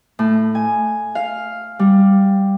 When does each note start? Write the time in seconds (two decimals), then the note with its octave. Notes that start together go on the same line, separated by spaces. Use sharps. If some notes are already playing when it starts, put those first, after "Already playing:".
0.19 A2
0.55 G#5
1.15 F5
1.79 G3